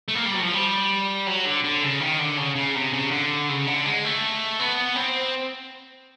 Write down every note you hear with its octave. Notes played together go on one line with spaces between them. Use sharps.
A3
A#3
G3
F#3
F3
G3
F#3
D3
D3
C#3
D#3
D3
C#3
C#3
C3
C#3
D3
C#3
D3
G#3
A3
B3
C4